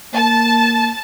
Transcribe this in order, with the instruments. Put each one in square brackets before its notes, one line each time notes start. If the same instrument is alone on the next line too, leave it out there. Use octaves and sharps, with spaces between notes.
[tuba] A#3 [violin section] A5